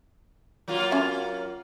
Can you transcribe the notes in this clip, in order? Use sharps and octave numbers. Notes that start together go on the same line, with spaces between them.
F#3 A#3 F4
D3 C#4 E5